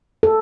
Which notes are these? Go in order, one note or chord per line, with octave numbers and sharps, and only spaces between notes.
A4